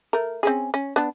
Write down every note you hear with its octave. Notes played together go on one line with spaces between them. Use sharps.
A3 A#4
C4 C#4 G#4
C#4
B3 D4